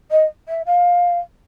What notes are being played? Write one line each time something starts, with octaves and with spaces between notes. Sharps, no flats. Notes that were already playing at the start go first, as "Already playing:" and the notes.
D#5
E5
F5